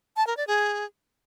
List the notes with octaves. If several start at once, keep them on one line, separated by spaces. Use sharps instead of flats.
A5
A#4
D5
G#4